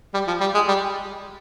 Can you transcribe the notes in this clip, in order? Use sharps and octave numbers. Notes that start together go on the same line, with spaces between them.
G3
F3
G3
G#3
G3